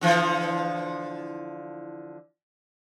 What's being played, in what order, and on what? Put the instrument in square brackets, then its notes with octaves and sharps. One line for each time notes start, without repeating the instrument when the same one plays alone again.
[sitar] D3 E3 F3